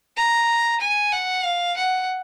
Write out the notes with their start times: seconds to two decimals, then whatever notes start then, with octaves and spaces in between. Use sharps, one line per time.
0.17 A#5
0.81 G#5
1.13 F#5
1.45 F5
1.77 F#5